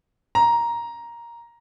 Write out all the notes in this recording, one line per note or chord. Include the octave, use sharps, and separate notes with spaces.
A#5